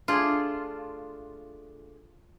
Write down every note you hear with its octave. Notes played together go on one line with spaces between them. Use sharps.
A3 D4 F4 G#4